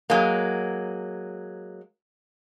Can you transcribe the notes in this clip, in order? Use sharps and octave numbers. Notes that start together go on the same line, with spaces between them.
F#3 G#3 A#3